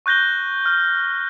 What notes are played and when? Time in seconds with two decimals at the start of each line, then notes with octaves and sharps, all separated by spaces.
0.06 C#6 F#6 G6 A#6 G7
0.66 F6